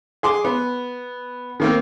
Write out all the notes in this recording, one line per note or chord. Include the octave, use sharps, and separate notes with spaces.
G#4 C6 D6
B3
D#3 A#3 C4